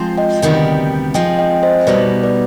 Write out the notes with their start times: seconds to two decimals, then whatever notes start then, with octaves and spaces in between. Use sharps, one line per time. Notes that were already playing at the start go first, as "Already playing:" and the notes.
Already playing: F3 G#3 C4 F4 C5
0.18 D#5 G5
0.42 D2 C3 D#3 G3 B3
1.14 F3 G#3 C4 D#5 G5
1.38 D#5 G5
1.63 C5 D#5
1.87 B2 G3 B3 D#4 B4 D5
2.23 B4 D5